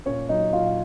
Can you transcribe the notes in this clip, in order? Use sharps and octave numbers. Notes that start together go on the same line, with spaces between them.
A#2 C#4 C#5
F#3 D#4 D#5
A#2 F4 F5